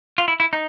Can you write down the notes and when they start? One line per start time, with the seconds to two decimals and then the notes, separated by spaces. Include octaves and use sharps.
0.18 F4
0.28 E4
0.40 E4
0.53 D#4